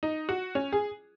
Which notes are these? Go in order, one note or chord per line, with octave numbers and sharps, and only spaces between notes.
D#4
F#4
C#4
G#4